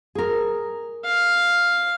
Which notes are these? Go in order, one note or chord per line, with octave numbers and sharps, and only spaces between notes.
G#4 A#4
F5